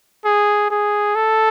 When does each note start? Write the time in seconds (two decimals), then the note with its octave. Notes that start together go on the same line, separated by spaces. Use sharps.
0.25 G#4
0.70 G#4
1.16 A4